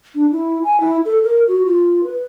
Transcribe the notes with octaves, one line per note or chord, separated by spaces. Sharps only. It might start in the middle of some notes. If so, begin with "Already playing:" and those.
D4
E4
G#5
E4
A4
A#4
F#4
F4
B4